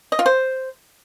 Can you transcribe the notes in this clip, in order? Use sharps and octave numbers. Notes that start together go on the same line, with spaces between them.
D#5
F4
C5